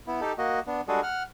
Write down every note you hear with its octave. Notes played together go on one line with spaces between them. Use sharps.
B3 E4
D#4 G4 A4
A#3 F#4 D#5
B3 D4
G3 G#3 D4 F#4 G#4 A4
F#5 F6